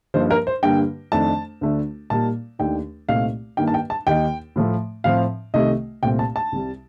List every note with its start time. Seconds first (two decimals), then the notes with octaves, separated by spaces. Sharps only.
0.14 G2 F3 A#3 D#4 C5
0.31 A#4
0.47 C5
0.63 G2 D3 G3 A#3 G5
1.12 F2 D#3 A3 D4 A5
1.61 D2 D3 A3 D4
2.10 A#2 G3 A#3 D#4 A5
2.59 D#2 D#3 A3 D4 G5
3.08 C2 A#2 A3 C4 D#4 F5
3.57 G2 D#3 A#3 D#4 G5
3.68 A5
3.74 G5
3.90 A5
4.07 D#2 D#3 A#3 D#4 G5
4.56 A2 F3 A3
5.04 A2 F3 C4 F5
5.54 C2 C3 D#3 A3 D#5
6.03 C2 A#2 A3 C4 G5
6.19 A5
6.36 A5
6.52 C2 C3 G3